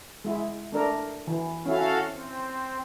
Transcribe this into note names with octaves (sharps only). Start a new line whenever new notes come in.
G#3 E4
A3 D4 A#4
E3
C#4 E4 F#4 A4 F5
C4